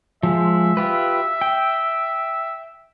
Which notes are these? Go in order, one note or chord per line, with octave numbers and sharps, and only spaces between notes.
F3 G#3 E5
F4 G4 B4
G5